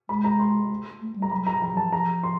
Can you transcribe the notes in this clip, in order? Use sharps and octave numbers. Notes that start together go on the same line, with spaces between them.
G#3 B5
A#5
C6
A3
G3
A#5
F#3 B5
A#5
F3 A#5
F#3
A5
F3
F3 A#5
C6